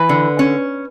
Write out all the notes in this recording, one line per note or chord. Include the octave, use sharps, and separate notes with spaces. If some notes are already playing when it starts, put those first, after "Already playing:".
Already playing: E3 B4
D3
C#4